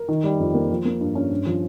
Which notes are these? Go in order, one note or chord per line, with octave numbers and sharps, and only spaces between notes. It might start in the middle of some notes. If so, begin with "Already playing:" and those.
Already playing: A#4
D#3
G3
F2
A#3
F3
A#3
G2
C#4
G2
F3